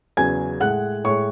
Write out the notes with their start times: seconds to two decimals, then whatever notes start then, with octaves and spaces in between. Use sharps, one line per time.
0.17 E2 C#3 F#3 G#5 G#6
0.60 A2 G#3 F#5 F#6
1.04 A2 G#3 C#5 C#6